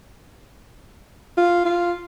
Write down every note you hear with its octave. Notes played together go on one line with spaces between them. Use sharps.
F4
F4